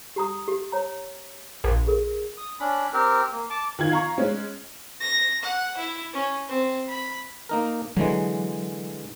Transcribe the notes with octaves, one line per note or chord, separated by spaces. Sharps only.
G4 A#5 D#6
G4
C#5 A#5
A#1
G#4 A#4
D#6
C#4 D4 B5
C4 G4 A#4
A#3
A5 D6
D#3 F4 G#6
F5 A#5 C#6
G#3 C#4
A#6
F#5
E4
C#4
C4
B5
A#3 D#4 A#4
D3 E3 F#3 G#3